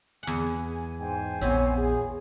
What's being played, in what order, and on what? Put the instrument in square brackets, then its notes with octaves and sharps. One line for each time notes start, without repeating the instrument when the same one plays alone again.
[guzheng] E2 F#5 [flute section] G#5
[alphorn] G#2 [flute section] C5 G5 G#5
[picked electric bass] A#1 B3 [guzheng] E3 C4 [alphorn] C#5
[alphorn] G#4